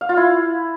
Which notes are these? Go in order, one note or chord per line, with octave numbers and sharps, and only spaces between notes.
F5
F4
E4